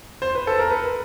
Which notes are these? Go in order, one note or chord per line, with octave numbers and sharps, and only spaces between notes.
C5
B4
A4
A#4
B4